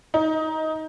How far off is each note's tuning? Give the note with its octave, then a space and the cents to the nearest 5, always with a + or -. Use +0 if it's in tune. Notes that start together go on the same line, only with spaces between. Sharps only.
D#4 +15